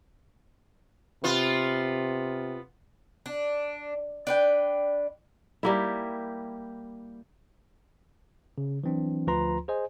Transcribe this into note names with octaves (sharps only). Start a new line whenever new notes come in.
C3 B3 F4
D4
D4 B4 G5
G3 A#3 E4
C#3
E3 F#3 C4 D4
D2 F3 F4 B4 A#5 C6
G#4 C5 D#5 G#5